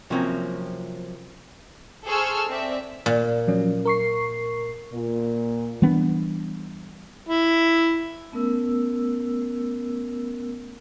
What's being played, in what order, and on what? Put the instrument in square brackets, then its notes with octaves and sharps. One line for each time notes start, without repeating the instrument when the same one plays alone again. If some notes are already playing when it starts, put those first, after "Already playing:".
[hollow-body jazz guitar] C3 F3 F#3 A#3 C4 C#4
[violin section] G#4 A4 C5 C#6 E6 F6
C4 D5 E5
[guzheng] A#2
[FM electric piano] F3 F#3 C#4
A#4 C#6 C7
[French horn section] A#2
[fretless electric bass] E3 G3 B3 D4
[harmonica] E4
[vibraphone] A3 B3 C#4 A#4 E6